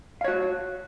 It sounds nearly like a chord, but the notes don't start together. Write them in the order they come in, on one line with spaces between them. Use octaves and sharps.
F5 C#5 F#4